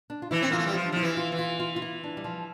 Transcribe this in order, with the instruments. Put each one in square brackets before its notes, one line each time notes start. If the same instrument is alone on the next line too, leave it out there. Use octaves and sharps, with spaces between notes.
[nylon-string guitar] D4
F4
[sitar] E3 [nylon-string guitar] E4
[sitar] C4
[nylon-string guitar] E4
[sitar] A#3 [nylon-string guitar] F4
[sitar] A3
G3
[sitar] F3 [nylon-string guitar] F4
[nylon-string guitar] D4
[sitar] F3 [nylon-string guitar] E4
[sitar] E3
[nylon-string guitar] F4
[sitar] E3
[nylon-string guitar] F4
F4
F4
E4
D4
G3
F3